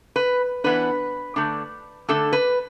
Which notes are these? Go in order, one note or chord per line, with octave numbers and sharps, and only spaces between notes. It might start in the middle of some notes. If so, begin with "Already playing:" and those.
B4
E3 B3 D4 B4
D3 A3 D4
D3 A3 D4 A4
B4